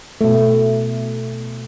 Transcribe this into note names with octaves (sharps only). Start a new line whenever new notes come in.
B2 A3